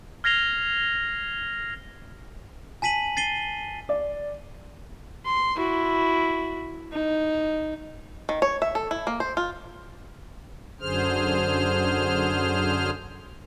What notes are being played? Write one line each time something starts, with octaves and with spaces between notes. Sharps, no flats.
F6 G#6 A#6 C7 F7 G7
G#5 A5 B6 D#7 F#7
A6 C7 D#7 G7
D5
C6
E4 F#4
D#4
D#3
C#5
E5
A4
E4
A#3
C5
F4
F#2 D3 G#4 C5 F6